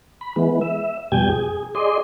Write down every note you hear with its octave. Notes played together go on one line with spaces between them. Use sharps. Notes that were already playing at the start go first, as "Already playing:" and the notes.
B5
E3 G#3 B3
E5
F2 B2 G3 G5 G#5 G#6
G#4
G#4 D5 D#5 C6